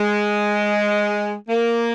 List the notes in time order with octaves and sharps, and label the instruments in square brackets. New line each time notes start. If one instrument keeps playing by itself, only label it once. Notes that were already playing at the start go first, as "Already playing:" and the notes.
Already playing: [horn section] G#3
A#3